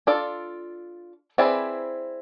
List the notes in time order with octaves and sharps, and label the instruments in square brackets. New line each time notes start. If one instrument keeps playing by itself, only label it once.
[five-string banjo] D4 F4 A4 D5
C4 E4 G#4 B4 D5